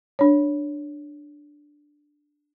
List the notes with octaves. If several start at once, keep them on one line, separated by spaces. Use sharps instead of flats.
D4 C#5